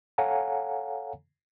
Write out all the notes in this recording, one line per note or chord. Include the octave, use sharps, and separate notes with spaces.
A4 C#5 F5 F#5 G#5 A#5